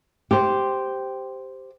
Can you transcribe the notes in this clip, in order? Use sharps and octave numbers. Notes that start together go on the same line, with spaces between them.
G4 C5